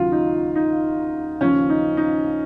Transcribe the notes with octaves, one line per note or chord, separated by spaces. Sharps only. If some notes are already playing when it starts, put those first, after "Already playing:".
Already playing: D#2 C#3 F#3 F4
D#4
D#4
D#2 C#3 F3 C#4
D#4
D#4